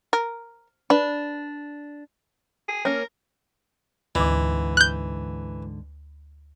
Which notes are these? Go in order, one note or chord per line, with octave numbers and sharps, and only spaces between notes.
A#4
D4 B4
G#4
A#3 C#4 A#4
D2 G#2 D3 E3 D6
F#6 G6